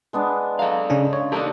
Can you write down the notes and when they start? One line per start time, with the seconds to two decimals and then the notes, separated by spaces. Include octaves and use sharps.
0.13 G#3 B3 D4
0.59 A4 D#5 F5 A#5
0.90 C#3 C#4 D4
1.13 C#5
1.32 D4 D#4 G4 A4 A#4 D#5